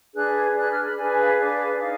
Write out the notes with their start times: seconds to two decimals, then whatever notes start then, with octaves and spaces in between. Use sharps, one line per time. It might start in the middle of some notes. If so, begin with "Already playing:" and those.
0.14 D4 G#4 B4 F#6
0.35 G#6
0.55 D4 G#4 B4 F#6
0.70 F6
0.84 B5
0.97 D4 G#4 B4 G#5
1.18 F5
1.39 D4 G#4 B4
1.80 D#4 F5